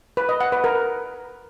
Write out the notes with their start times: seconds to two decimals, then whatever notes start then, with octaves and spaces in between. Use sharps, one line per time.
0.17 B4
0.29 D#5
0.41 F#5
0.52 B4
0.64 A#4